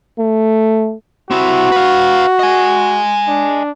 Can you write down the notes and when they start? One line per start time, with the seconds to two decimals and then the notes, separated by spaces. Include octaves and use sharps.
0.19 A3
1.31 C4 E4 F#4
1.72 B4 F5
2.39 D#5 G#5
3.28 D4